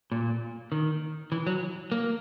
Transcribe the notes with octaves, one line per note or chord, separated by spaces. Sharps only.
A#2
D#3
E3
F#3
A#3